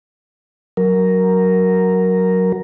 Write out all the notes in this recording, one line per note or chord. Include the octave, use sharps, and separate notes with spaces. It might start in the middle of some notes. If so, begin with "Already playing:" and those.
F#3 A#4